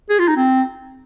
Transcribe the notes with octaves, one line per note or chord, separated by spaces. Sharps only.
G#4
F4
D#4
C4